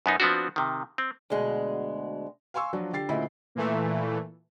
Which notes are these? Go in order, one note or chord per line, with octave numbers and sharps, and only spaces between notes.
F#2 B3 D#4
F3 B3 C4 D4 F#4
C3 D#3
C4
D2 B2 G#3 G#4
F5 G#5 C6 C#6 E6
F3 F#3 D4 F4 F#4
D3 G4 A6 C7
D2 A#2 C#3 E4 D#5 B5
A#2 E3 A3